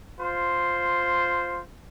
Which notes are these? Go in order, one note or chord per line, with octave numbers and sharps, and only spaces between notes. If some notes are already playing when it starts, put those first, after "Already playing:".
F4 C5